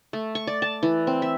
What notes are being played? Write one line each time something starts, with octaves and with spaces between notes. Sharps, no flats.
A3
C#6
D5
A5
E3
C4
E5